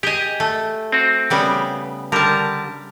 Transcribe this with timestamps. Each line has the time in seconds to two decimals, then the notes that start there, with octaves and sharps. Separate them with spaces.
0.03 G4 G#4 D#5 G5 G#5
0.40 A3
0.92 C4 F#4
1.30 C#3 G3 B3
2.12 D3 G3 A#4 A5